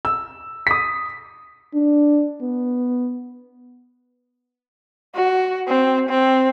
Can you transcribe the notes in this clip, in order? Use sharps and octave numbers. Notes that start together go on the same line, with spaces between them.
E6
D#6 B6
D4
B3
F#4
C4
C4